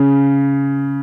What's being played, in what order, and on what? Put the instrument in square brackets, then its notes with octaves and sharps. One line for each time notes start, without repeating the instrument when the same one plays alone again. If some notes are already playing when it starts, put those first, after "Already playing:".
Already playing: [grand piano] C#3